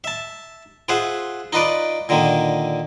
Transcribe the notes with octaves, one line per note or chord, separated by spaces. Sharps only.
E5 A5
F4 G#4 C5 E5 F#5
D#4 F4 B4 D5
A#2 D3 D#3 A#3